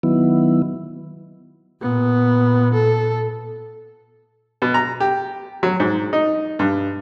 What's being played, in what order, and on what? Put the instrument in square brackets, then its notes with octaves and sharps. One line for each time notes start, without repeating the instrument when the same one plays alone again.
[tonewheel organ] D#3 F#3 B3 E4
[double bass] A#2 [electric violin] B3
[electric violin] A4
[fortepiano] B2
A#5
G4
F#3
G#2
D#4
G2